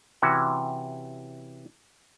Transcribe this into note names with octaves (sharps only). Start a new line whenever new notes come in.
C3 E3 C#4 F#4